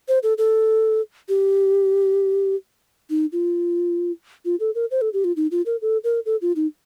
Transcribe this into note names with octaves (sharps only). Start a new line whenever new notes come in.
C5
A4
A4
G4
D#4
F4
F4
A4
A#4
C5
A4
G4
F4
D#4
F4
A#4
A4
A#4
A4
F4
D#4